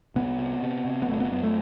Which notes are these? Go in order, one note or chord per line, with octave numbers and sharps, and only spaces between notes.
C2 B3
C3
C3
C3
B3
G1 A3
B3
F#2 B3
A3